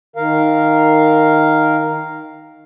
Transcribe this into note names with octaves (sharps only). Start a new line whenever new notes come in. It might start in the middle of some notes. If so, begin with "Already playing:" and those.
D#3 A#4 F5